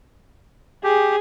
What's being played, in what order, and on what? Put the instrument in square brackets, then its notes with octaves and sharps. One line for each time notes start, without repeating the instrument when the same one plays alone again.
[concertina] G4 [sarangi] G#4